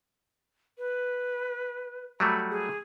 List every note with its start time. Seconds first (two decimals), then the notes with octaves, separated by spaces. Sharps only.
0.78 B4
2.20 F#3 G3 A3 B5
2.51 G#4